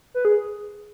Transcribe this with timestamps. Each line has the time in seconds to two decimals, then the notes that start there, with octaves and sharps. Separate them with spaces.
0.14 B4
0.25 G#4